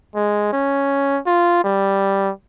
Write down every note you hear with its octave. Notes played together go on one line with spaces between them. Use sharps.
G#3
C#4
F4
G3